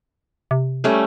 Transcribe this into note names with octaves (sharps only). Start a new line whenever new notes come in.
C3
G3 A3 C#4